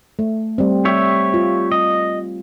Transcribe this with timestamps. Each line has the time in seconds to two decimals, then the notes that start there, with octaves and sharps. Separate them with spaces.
0.19 A3
0.58 G3 C4
0.85 G4 C#5 E5
1.34 F4
1.72 D#5